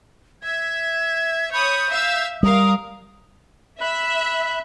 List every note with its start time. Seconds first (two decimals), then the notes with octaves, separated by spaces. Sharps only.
0.43 E5 G#6
1.51 C#5 B5 D#6 G6
1.90 E5 F5 E6
2.43 G3 A#4 F5 D#6
3.81 E5 B5 F#6